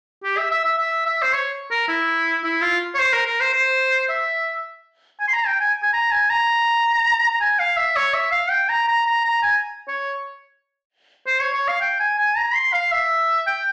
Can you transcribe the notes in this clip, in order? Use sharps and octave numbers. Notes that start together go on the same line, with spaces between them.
G4
E5
E5
E5
E5
E5
C5
C#5
A#4
E4
E4
F4
C#5
C5
A#4
A#4
C5
C5
E5
G#5
C6
A#5
G5
G#5
G#5
A#5
G#5
A#5
A#5
G#5
F5
E5
C#5
E5
F5
G5
A#5
A#5
A#5
A#5
G#5
C#5
C5
C#5
C#5
F5
G5
G#5
G#5
A#5
C6
F5
E5
G5